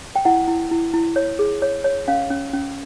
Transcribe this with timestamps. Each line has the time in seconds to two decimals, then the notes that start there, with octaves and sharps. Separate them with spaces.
0.16 G5
0.25 E4 F#5
0.48 E4
0.71 E4
0.93 E4
1.16 C#5
1.39 G#4
1.62 C#5
1.84 C#5
2.08 C#4 F5
2.30 C#4
2.53 C#4